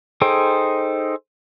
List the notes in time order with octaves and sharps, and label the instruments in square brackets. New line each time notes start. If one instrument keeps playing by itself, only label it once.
[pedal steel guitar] D#4 G#4 A4 C5 G5